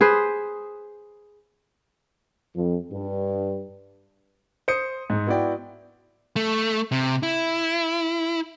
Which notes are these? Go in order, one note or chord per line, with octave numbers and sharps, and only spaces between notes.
G#4 B4 C5
F2
G2
C5 D#6 C#7
G#2
B3 E4 F#4 D5 G5
A3
C3
E4